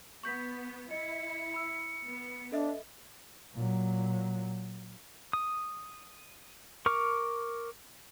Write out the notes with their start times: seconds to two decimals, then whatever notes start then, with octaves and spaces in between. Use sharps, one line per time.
0.24 B3 C#6 G6 B6
0.91 E4 D#5 C#7
1.54 B5 E6
2.05 B3
2.52 D4 A4 D#5 E5
3.55 A#2 F#3
5.33 D#6
6.86 A#4 C#6 D6 F6